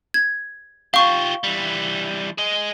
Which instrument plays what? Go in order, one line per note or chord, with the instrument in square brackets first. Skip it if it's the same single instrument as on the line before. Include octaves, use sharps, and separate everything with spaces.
[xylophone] G#6
[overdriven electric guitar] F4 G4 [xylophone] F5 C#6
[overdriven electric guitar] E3 G3
G#4 D#5